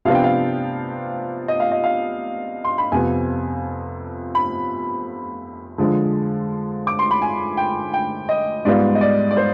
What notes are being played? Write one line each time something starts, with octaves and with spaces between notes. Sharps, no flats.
C3 F3 B3 D4 F4 F5
G5
F5
D#5
F5
D#5
F5
C6
B5
F2 C3 F3 B3 G#5
B5
D3 F3 G#3
D6
C6
B5
G#5
G5
G5
D#5
G#2 G3 B3 F4 D5
D#5
D5
D5
C5